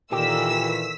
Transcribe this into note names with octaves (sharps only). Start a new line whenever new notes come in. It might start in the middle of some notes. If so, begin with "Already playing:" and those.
A#2 D#3 E3 G4 A4 E6 B6